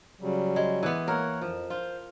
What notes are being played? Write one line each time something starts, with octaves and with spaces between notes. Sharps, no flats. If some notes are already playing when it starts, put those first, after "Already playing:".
C#3 F#3 G3
G#3
E3 B3
A#3 A#4 C#5 F#5
F2 F3
F4 C5